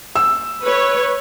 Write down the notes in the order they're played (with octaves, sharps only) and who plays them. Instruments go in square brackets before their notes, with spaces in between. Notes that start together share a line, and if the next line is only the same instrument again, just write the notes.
[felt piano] E6
[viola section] B4 C#5